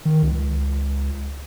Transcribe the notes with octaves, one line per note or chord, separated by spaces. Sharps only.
D#3
C#2